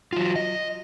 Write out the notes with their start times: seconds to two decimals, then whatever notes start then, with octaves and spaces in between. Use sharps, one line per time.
0.13 F#3 F4
0.36 D#5